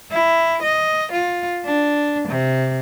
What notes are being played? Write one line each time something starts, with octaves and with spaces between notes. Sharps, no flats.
E4
D#5
F4
D4
C3